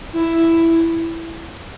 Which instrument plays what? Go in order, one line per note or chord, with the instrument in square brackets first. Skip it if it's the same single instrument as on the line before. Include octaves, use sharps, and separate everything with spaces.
[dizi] E4